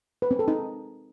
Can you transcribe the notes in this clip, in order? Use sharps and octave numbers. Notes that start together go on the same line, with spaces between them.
B4
C4
A4
D#4